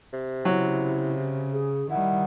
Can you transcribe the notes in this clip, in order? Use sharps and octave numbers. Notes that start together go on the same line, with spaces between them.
C3
C#3 F#3 E4
G#4
D#3 G3 E4 F#5